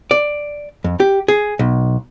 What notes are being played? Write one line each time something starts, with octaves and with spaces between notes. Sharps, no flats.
D5
F2
G4
G#4
B1